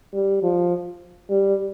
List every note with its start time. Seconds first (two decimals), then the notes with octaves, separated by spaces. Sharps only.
0.13 G3
0.43 F3
1.30 G3